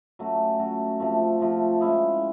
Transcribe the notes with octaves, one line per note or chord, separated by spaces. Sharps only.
F#3 A3 C#4 F#4
F#3 A3 C#4 F#4
C3 F3 A3
C3 F3 A3
G#3 C#4 E4 G#4